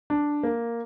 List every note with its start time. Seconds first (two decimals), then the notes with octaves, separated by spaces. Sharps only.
0.10 D4
0.43 A#3